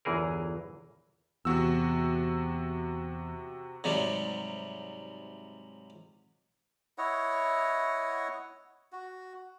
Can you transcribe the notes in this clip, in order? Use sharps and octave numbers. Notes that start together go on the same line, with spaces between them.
G1 E2 E3 G#4 A#4
E2 C3 F#4 E6
G#2 C3 F#3 G3
E4 C#5 D#5 F#5
F#4